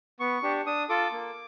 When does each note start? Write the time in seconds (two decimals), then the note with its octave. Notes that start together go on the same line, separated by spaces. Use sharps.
0.20 B3 C#6
0.43 D4 G4
0.66 D4 D#6
0.89 F4 A4 D6
1.12 A#3